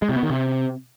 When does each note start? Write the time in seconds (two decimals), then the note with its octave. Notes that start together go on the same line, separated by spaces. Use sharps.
0.02 G#3
0.09 C3
0.16 B3
0.23 D#3
0.30 C3